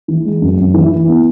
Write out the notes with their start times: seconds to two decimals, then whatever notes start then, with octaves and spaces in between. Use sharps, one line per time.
0.08 E3
0.25 G#3
0.42 F#2
0.58 F#2
0.74 E3
0.91 E4
1.08 B3